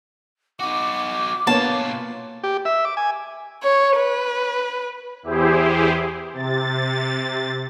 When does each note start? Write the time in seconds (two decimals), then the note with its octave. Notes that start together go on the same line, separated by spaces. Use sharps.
0.60 D#4 F#4 D6
1.47 B2 A#3 B3 F4 C#5 A5
2.43 G4
2.65 E5
2.85 D6
2.97 G#5
3.63 C#5
3.97 B4
5.23 E2 E4 G4 G#4 C5
6.33 C3 A6